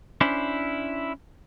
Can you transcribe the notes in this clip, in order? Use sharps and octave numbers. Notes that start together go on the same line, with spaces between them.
C#4 D4 E4 C5